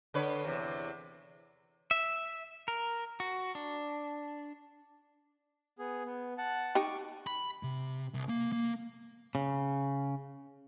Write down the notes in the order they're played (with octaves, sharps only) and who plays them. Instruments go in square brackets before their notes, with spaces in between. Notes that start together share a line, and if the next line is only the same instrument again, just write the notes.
[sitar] D3 B4 C#5
E2 C3
[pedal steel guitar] E5
A#4
F#4
D4
[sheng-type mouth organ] B3 G#4
B3
F#5 A5
[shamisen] D#4 G4 [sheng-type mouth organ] C#6 D6
[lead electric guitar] B5
C3
C2
A#3
A#3
[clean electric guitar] C#3